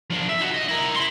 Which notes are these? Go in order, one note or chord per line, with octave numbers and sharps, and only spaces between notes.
F3 D4
E5
D#4 F#4
D#5
E4 A#4
E4 C6